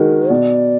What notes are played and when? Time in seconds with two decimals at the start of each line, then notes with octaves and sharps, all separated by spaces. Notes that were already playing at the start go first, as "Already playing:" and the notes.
Already playing: D#3 G#3 D#4 F#4 A#4
0.30 B2 D5